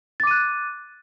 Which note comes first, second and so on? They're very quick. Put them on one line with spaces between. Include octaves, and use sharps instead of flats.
A6 D6 D#7 F#6